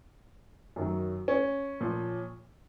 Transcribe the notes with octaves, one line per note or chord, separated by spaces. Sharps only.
F#2 D#3 F#3
C#4
A#2 F3